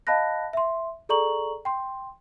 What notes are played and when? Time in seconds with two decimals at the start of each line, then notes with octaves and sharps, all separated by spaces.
0.07 D#5 F5 A5 B5 F#6 A#6
0.53 E5 C6
1.09 G#4 A4 D5 A#5 C#6 F#7
1.65 G5 C6